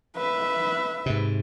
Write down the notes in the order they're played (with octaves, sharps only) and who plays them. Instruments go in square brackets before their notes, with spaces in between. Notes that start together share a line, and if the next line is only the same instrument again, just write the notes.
[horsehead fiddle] B4 E5
[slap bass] G#2 C3